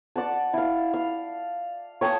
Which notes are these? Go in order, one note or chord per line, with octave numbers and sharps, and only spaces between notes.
D5 F#5 A5
E4 F5
F5
C#5 G5 A5 D#6